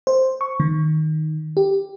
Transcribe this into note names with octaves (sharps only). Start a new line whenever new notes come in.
C5
C#6
D#3
G4